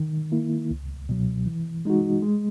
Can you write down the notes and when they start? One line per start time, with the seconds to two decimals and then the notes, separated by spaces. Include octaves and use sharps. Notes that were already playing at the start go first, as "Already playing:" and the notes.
Already playing: D#3
0.32 A#3 E4
0.71 C#2
1.09 B2 F#3
1.46 E3
1.85 G#3 D#4 F#4
2.22 G#3